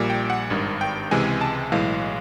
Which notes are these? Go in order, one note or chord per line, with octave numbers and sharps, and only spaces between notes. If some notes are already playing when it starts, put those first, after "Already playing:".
Already playing: A#1 A#2 G3
G5
F#5
G#1 G2 D#3
G5
C#2 C3 E3 G#3 G#5
A5
B1 A2 E3 G#3 F5